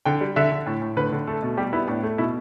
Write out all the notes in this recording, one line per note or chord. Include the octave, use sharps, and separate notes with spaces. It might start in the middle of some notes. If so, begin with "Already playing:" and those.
D3 G5
G3
D3 E5
D3
A2
A2
D3 B4
D3
A3 A4
B2
G3 G4
B3 E4
A2 D4
A3
B2 E4